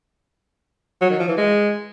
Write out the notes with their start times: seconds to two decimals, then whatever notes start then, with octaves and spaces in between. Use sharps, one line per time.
1.01 F#3
1.10 D#3
1.19 F3
1.28 E3
1.37 G#3